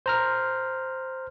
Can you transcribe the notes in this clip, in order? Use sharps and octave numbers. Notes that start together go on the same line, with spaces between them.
C5 A#5 F6